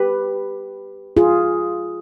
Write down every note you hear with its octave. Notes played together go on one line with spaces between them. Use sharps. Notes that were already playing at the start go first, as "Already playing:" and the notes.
Already playing: G4 B4
F4 G#4